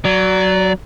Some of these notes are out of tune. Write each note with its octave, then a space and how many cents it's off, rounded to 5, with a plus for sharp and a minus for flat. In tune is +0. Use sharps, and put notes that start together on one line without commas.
F#3 +10 D5 -20